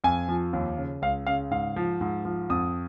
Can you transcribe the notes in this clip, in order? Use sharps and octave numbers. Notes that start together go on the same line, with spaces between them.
F2 G#5
F3
D#2
C#3
C#2 F5
C#3 F5
G#2 F5
F3
G#2
F3
F2 D#6